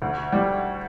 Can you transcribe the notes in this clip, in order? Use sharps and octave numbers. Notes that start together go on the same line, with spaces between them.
D2
G3